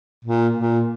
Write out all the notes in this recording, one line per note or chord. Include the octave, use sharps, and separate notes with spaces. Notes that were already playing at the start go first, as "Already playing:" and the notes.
A#2
A#2